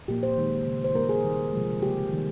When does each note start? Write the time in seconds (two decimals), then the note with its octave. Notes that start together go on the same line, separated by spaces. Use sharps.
0.08 A#2 F3 A#3 G4
0.23 C5
0.38 D#3 G#3
0.66 C#3 G#3
0.84 C5
0.95 C#3 G3 A#3 A#4
1.09 G#4
1.24 D#3 G3 A#3
1.53 C3 F3 G#3
1.82 C#3 G3 A#3 G4
2.11 D#3 G3 A#3